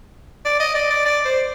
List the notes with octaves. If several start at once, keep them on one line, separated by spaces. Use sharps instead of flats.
D5
D#5
D5
D5
D5
C5